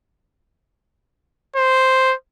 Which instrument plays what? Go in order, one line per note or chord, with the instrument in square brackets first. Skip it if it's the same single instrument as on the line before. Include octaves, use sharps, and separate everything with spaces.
[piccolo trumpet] C5